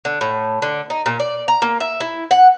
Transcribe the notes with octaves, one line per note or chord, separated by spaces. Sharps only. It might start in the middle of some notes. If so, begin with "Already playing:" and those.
D3
A2
D3
D#4
A#2
D5
A#5
A#3
E5
E4
F#5